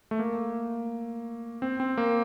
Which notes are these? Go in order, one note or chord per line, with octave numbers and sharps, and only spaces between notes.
A3
A#3
C4
C4
A#3